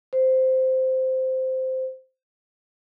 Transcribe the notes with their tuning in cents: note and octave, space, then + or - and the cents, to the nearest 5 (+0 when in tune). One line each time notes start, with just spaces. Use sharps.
C5 -10